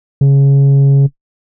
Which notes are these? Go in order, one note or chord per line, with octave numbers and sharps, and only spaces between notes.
C#3